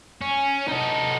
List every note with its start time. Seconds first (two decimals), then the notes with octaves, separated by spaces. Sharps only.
0.22 C#4
0.68 D#4 A4